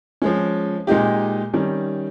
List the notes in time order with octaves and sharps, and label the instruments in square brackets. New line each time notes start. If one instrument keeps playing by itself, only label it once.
[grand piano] F3 G#3 C#4
A#2 G#3 D#4 G4
D#3 G3 C#4